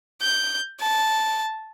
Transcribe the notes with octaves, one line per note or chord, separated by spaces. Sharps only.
G6
A5